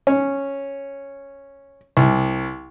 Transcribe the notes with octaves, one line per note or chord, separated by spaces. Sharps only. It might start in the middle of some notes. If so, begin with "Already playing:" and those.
C#4
C2